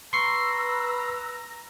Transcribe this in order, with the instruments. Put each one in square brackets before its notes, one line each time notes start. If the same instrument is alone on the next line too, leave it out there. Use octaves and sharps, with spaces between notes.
[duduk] B4 [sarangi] A#5 [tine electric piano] C6 C#6 C7 [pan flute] E6